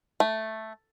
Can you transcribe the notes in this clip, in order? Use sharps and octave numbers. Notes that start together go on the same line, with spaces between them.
A3